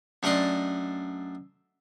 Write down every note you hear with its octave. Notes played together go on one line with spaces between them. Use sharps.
F#2 A3 D4 D5 D#5 C6